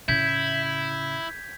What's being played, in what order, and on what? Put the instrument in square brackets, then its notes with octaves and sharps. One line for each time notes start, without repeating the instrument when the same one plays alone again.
[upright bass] A2 C#3 [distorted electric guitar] E4 [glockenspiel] G6 G#6 B6